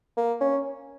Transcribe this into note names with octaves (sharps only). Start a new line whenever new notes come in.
A#3
C#4